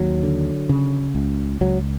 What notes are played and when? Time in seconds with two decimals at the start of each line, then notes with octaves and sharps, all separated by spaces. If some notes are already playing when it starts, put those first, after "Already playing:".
Already playing: D#2 F#3
0.23 D3
0.69 C#3
1.15 C#2
1.61 C#2 F#3